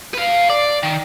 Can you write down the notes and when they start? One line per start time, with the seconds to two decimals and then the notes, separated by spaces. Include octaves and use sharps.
0.14 B4 F5
0.50 D5
0.83 D#3